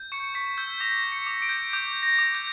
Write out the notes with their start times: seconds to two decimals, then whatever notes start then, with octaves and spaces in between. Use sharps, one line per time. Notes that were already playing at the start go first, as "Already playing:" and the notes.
Already playing: G6
0.12 C#6 C#7
0.35 C#6 B6
0.57 E6 G6
0.80 D6 A#6
1.04 G6
1.12 C#7
1.27 D6
1.42 D7
1.49 G6
1.73 D6 G6
1.96 G6
2.03 A#6
2.19 D6
2.35 G6